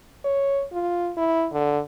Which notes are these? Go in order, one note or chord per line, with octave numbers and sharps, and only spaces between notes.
C#5
F4
E4
D3